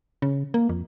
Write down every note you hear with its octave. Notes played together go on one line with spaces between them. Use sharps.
C#3
A#3
F2